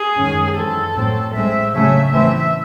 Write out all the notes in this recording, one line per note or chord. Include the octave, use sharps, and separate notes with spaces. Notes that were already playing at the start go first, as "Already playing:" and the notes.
Already playing: G#4
F#2 D#3 G#3 C#4
F#2 E3 C4 A4
A2 F#3 C4
A2 G#3 C4 E5
C#3 F#3 A3 C#4 E5
A2 E3 A3 C4 E5